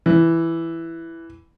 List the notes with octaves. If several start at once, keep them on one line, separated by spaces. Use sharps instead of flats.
E3